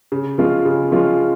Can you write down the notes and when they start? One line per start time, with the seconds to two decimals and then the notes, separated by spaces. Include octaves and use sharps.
0.12 C#3
0.38 F3 G#3 C#4 F4
0.65 C#3
0.92 F3 G#3 C#4 F4